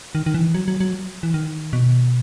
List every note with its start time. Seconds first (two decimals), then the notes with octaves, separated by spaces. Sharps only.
0.15 D#3
0.26 D#3
0.34 E3
0.54 F#3
0.68 F#3
0.80 F#3
1.23 E3
1.34 D#3
1.73 B2